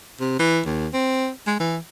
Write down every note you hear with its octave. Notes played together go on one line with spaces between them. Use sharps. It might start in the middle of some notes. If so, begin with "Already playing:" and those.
C3
E3
D#2
C4
G#3
E3